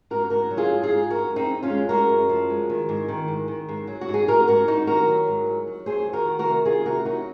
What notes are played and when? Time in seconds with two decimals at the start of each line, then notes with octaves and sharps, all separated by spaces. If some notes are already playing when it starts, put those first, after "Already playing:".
0.10 G#2 F#4 A#4
0.30 G#2 F#4 A#4
0.51 F#3
0.57 F4 G#4
0.71 G#2
0.83 F4 G#4
0.90 G#2
1.10 G#3 F#4 A#4
1.30 F#2
1.36 C4 D#4
1.50 F#2
1.63 C#4 F4
1.70 G#3
1.89 G#3 F#4 A#4
2.09 F#2
2.29 F3
2.50 G#3
2.70 D#3
2.89 G#2
3.08 D#3
3.28 G#2
3.48 D#3
3.69 G#2
3.87 F#3
4.01 F#4
4.08 G#2
4.14 G#4
4.28 G#2 F#4 A#4
4.47 G#2 F#4 A#4
4.68 G#2 D#4 F#4
4.87 D#3 F#4 A#4
5.07 F#3
5.27 G#2
5.46 F#3
5.67 F#3
5.86 F2 G#4 C5
6.06 D#3
6.13 F#4 A#4
6.26 D#3
6.39 F#4 A#4
6.46 C3
6.65 D#3 F4 G#4
6.86 C3 F#4 A#4
7.05 F#3 D#4 F#4